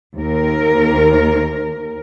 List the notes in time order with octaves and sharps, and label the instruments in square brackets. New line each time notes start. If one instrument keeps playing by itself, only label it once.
[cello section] D#2 A#4